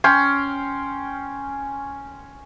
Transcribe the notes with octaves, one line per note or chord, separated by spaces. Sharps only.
C#4 G5 C6